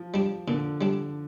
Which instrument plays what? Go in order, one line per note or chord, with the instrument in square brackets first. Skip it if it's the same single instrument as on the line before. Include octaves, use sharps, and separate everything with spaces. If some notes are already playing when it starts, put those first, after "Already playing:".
Already playing: [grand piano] F3
[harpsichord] G3 D4
[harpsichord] A#2 [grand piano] D3
[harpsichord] G3 D4